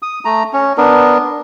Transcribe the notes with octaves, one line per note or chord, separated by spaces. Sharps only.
D#6
A3 A#5
C#4
B3 D4 A#4